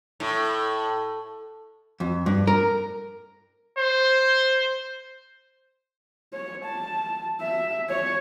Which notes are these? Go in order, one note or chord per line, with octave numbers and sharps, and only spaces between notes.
A2
F2
G2
A#4
C5
C#5
A5
E5
C#5